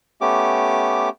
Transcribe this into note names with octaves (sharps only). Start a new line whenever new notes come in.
A3 B3 C#4 G4 D6